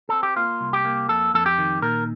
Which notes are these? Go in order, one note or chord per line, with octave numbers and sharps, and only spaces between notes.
C4 A4
G4
A#3 F4
C2
G4
A#3
F2 A4
F2 A4
G4
D#3
A#2 A#4